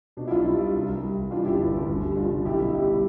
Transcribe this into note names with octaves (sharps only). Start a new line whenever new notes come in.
B2 D4
E4
B1 D4 F4
G3
G3
C2
C2
G3
C2
E3 D4 F4
G1 E4 G4
G1 D4
G1
D2
G3
G3 D4 F4
D3
B1 E4 G4
B2
G3 E4 G4
G3